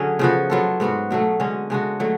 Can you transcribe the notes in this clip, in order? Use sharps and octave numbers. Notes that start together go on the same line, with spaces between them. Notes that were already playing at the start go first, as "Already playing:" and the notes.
Already playing: D3 F#3 C#4 G#4
C#3 F3 B3 F#4
F#3 B3 F4 A4
G#2 F#3 B3 F#4
B2 F#3 A3
D3 G#3 C#4
C#3 G#3 D4 F#4
D3 F#3 A3